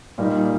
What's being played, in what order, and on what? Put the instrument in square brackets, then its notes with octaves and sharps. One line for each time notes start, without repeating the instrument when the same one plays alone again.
[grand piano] A#2 G3 A#3 D#4